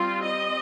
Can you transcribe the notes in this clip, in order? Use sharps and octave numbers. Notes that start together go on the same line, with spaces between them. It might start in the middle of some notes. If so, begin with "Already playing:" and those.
Already playing: G3 C4 F4
D#5